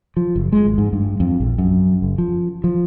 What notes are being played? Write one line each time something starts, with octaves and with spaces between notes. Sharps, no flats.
F3
F#1
G#3
G#1
G#2
G2
F2
A#1
F#2
F#1
F3
F3